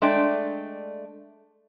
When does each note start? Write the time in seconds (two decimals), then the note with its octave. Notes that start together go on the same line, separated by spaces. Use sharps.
0.02 G#3 A3 D4 D5 G5